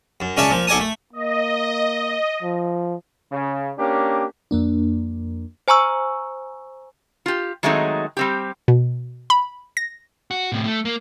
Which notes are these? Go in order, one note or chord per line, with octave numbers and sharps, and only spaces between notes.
F#2
C#2 C#4 D5 E5 A5
A#2 F3
B1 A4 D5 G#5 A5 D#6
A3
A#3 D#5
F3
C#3
A#3 C#4 D4 G4
F2 A#3 D4
C5 G#5 A#5 C#6 E6
F4 G4
D#3 F#3 G#3 A3 C4 D#4
G3 C4 G4
B2
B5
A#6
F#4
A2 C3
A3
A#3